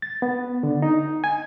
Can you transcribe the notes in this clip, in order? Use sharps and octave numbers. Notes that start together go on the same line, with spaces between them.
A6
B3
D3
D#4
G#5